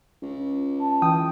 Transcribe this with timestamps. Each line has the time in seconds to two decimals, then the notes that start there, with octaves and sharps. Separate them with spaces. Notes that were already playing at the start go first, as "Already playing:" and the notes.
0.22 C#2
0.80 A5
1.02 E3 G5 D#6